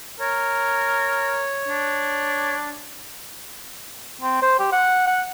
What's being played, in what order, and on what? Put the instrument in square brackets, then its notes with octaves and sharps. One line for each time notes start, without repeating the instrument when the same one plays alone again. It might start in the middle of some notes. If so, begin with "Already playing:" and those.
[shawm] A#4 [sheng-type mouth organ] C#5
[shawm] D4
[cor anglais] C4
C5
G4
F#5
F#5